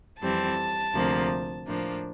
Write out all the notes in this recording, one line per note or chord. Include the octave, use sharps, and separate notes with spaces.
F2 E3 G3 C4 A5
D2 C3 F3 A#3
A2 F3 A#3 D4